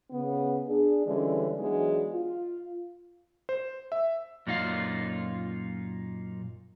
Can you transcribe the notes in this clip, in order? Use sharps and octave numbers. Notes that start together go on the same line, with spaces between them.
C#3 B3
D4 G#4
D3 E3 G3 G#3 C#4
E3 F#3 G#3 B3 D4 D#4
F4
C5
E5
F#2 A#2 D#4 F4 F5